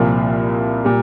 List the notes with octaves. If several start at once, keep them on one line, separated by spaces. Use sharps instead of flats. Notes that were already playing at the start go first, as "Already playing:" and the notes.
Already playing: C2 A#2 F3 A#3 F4
A#2 G3